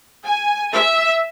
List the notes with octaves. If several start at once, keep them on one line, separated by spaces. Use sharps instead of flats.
G#5
E5